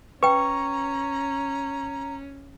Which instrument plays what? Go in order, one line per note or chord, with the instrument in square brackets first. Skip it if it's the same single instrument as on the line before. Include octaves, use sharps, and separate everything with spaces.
[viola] C#4 [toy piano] B4 G5 [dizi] A#5 [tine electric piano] C#6